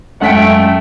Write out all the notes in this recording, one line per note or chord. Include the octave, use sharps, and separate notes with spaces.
F#2 G#3 A3 F#5 G5 B6 C#7